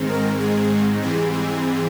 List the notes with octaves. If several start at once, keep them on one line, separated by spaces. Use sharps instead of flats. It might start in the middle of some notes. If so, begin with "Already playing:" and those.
Already playing: G#2 D#3 G#3 C4
A#4
G#4
G#2 E3 G3 C4 G#4
G#4